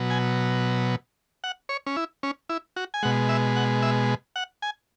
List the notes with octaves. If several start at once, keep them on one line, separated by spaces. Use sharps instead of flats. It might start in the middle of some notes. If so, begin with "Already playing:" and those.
Already playing: B2 F#3
G#5
F#5
C#5
C#4
E4
C#4
E4
F#4
G#5
B2 G#3 F#5
E5
F#5
E5
F#5
G#5